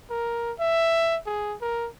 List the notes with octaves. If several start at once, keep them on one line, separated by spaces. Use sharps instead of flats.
A#4
E5
G#4
A#4